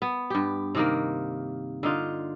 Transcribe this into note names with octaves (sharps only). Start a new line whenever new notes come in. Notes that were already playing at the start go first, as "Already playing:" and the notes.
B3
G2 G4
C3 D#3 A#3
D3 D#4 F4